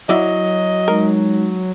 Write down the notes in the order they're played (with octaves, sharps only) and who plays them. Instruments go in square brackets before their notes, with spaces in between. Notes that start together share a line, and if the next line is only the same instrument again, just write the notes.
[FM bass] F#3 [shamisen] E4 F#4 D5 [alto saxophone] D#5
[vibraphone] G#3 D#4 [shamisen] A#4